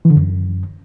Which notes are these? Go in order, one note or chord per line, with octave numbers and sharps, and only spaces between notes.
E3
D3
F#2